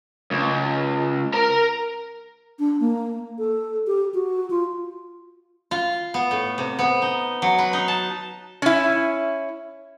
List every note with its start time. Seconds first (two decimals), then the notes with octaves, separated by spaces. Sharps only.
0.31 C#2
1.34 A#4 A#5
2.59 D4
2.80 A#3
3.39 A4
3.87 G4
4.14 F#4
4.50 F4
5.71 F4
6.14 B3
6.31 A2
6.58 C3
6.79 B3
7.02 D#4
7.42 F#3
7.58 B4
7.73 D#4
7.88 A5
8.62 C#4 E4